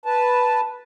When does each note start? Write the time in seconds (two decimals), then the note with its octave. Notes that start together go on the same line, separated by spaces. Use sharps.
0.06 B4 A5